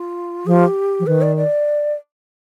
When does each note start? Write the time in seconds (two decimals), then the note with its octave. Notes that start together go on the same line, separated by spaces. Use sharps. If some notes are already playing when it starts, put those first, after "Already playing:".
Already playing: F4
0.46 F3 G#4
0.51 G4
1.00 F3
1.07 D#3 B4
1.22 D5
1.37 D5